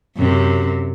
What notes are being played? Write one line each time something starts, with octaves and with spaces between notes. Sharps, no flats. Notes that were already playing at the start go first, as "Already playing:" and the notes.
F#2 C3